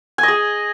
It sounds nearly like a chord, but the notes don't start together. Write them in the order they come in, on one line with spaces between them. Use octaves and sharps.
G#5 D#5 G#4